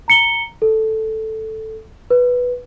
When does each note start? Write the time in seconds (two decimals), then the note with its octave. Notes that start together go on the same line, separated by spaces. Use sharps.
0.08 A#5 C#7 G7
0.62 A4
2.11 B4